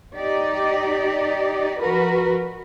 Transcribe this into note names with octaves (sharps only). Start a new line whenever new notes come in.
D#4 G4 D5
F3 F#4 A#4 B4